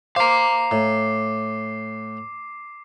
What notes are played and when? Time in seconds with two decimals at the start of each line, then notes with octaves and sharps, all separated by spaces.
0.16 C5 F5 A#5 D6 C7
0.71 A2